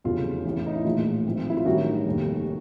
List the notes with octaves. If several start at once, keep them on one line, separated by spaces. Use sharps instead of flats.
F1 E2 C#3 F#3 F4
A1 A2 E3
D#4
E4
A#1 A2 E3 F4
G#1 G#2 F3
E4
F4
A1 G2 D#3 F#3 F#4
F1 D#2 D#3 G3